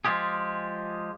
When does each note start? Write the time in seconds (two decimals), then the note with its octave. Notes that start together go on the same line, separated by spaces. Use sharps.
0.05 F3 G#3 F4 G4 G#4